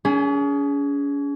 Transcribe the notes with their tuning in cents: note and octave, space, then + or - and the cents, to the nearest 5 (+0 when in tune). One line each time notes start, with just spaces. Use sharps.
C#4 +40 G#4 +0